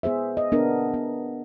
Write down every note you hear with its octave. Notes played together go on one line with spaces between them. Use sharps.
B3 G#4 C5 E5
D#5
B3 D4 A#4
B3